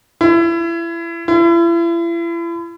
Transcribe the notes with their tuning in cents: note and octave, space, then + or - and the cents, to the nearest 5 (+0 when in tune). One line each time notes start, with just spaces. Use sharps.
E4 +30
E4 +40